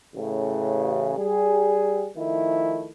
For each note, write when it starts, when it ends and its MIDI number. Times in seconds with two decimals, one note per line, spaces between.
0.15 1.14 33
0.15 1.14 49
1.17 2.08 55
1.17 2.08 68
2.16 2.90 51
2.16 2.90 53
2.16 2.90 57
2.16 2.90 64